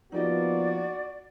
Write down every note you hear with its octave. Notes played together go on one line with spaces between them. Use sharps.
F3 A#3 B3 D#4 F#4 G4 D5 D#5